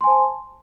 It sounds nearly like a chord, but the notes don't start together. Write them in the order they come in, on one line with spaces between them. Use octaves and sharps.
C6 G#5 C5 A5